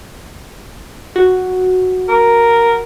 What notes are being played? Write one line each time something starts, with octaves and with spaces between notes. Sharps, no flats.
F#4
A#4